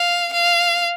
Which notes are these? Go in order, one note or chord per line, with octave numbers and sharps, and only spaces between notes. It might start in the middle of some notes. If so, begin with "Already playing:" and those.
Already playing: F5
F5